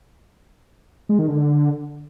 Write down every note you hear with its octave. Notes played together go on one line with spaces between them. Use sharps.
G#3
D#3
D3